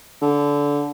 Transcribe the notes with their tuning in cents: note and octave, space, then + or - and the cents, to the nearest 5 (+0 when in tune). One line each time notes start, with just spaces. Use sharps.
D3 -20